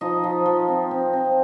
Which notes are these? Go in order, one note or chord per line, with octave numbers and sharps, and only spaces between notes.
F3 D#4 D#5
F3
F3
C4
C4
C4